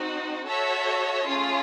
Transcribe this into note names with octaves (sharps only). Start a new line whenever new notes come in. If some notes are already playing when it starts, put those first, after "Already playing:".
Already playing: C4 D#4 F#4
F#4 A4 C#5 E5 A5
A3 C#4 F4 G#4